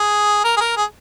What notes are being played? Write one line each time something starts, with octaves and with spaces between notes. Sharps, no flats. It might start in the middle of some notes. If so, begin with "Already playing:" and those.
Already playing: G#4
A#4
G#4
A#4
G#4